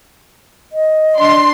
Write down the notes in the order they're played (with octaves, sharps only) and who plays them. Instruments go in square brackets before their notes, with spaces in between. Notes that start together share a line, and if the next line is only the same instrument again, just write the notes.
[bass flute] D#5
[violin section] D4 C6